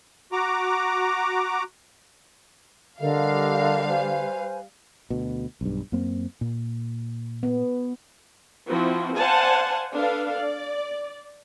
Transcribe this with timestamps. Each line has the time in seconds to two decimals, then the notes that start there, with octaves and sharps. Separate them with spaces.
0.32 F#4 A#5 D6
3.00 D3 G3 A4 A#4 D#5 F5
3.88 B4 C5 G#5
5.10 D2 B2
5.61 B1 G2
5.92 F#2 A#3 C4
6.41 A#2
7.43 B3
8.67 F3 C4 E4 F#4
9.17 C5 D5 F5 F#5 G#5 A5
9.95 D4 A4 B4 F5
10.36 D5